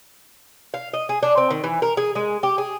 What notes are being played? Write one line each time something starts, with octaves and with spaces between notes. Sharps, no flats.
F5
D#5
G#4
D4
C4
D#3
E3
A#4
G#4
G#3
G4
G#4